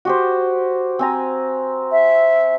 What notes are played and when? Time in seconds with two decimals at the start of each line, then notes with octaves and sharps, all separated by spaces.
0.05 F#4 G4 C5
0.99 C4 G#5 A#5
1.92 E5